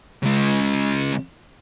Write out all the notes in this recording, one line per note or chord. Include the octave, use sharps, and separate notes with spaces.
C#3 G#3